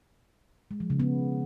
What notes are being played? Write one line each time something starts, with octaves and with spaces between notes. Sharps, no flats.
G#3
F3
C#3
B3